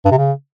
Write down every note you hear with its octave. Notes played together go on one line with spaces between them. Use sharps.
G2
C3
C#3